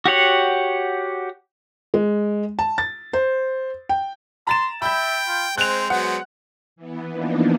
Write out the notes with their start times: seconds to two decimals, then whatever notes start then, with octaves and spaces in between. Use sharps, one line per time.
0.06 F#4 G4 C#5 F#5
1.94 G#3
2.59 A5
2.78 A6
3.13 C5
3.89 G5
4.47 A#5 C6 A6 E7
4.82 E5 G5 B5 G6
5.28 F4
5.58 G#3 C4 C5 F#6 F7
5.90 F#3 G#3 B3 F#5
6.76 E3 B3
7.12 E3 F3 A#3 B3 D4 D#4